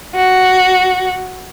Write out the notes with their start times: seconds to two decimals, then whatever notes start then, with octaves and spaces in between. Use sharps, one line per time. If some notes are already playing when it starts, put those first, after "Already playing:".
0.15 F#4